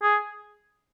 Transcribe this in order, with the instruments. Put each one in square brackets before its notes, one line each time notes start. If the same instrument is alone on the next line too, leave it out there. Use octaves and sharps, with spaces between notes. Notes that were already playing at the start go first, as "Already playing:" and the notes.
[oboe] G#4